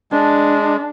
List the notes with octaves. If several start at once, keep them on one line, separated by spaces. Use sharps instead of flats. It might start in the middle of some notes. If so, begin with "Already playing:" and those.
G#3 D4